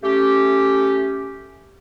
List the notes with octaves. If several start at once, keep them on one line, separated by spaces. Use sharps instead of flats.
A3 C#4 G4